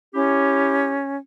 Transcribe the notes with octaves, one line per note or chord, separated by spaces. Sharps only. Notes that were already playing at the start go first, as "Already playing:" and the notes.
C#4 E4 G4